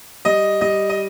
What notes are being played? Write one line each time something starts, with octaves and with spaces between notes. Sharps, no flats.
G3 D#5
G3 D#5
D#5